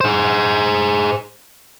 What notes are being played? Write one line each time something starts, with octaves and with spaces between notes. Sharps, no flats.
G#4 C5